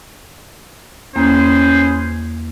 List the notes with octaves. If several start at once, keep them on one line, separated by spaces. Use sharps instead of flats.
E2 A#3 C#4 G#4 B4 C5